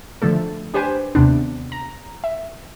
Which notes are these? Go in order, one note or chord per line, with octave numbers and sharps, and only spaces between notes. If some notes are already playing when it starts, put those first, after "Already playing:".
D3 F3 A3 A4
D4 G4 B4 C5 G#5
D#2 C3 B3 D4
A#5
E5